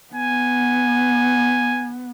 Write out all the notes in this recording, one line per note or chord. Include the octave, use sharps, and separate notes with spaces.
B3 G#5